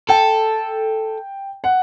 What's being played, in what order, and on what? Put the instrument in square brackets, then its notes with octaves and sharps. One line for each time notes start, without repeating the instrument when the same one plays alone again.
[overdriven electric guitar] A4 [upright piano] G5
[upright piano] F#5